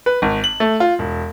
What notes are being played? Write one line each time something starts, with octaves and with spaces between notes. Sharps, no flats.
B4
G#1
F#7
A3
F4
E1